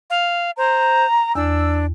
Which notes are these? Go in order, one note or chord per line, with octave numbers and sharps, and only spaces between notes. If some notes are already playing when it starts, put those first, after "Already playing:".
F5
C5 A#5
E2 D4 E6